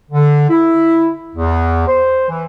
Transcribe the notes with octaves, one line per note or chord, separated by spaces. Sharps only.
D3
E4
E2
C5
E3